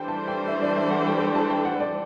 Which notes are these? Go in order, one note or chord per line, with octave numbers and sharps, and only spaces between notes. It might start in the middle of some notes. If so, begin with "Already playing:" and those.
Already playing: E3 G3 D4 A4 C5 G5
A5
G5
E5
D5
E5
F#5
G5
G5
A5
G5
F#5
D5